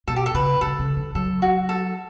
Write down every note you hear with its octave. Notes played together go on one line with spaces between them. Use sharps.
B2 A4
G4
A4
C#3 B4
C#3 A4
C#3
D3
F#3 A4
F#4
A4